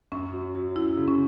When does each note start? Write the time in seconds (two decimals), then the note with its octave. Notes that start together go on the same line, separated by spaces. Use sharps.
0.12 F#2 C#4
0.33 F#3
0.55 F#3
0.76 F#2 E4
0.97 C#3
1.08 C#4